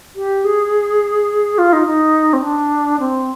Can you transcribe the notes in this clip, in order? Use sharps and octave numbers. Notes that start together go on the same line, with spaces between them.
G4
G#4
F4
D#4
D#4
C4
D4
C4